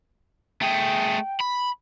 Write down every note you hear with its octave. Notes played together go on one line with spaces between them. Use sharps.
A3 G#4 G5
B5